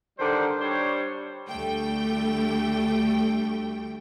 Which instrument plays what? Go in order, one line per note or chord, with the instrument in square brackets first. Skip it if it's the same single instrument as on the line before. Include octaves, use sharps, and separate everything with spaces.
[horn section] D3 D#3 G3 C5
G3 D4 C5 C#5
[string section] D2 D3 G3 A3 G5